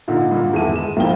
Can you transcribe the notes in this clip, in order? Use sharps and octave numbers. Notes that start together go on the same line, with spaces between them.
A#2 D3 D#4
G2 A#2 D3
G1 E2 D#3 A4 E5 D#7
G#3 E7
B1 F3 A#3 E4 G5 G7